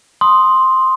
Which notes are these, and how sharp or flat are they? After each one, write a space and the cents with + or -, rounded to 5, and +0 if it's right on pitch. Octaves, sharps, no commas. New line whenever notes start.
C6 +0 D#6 +0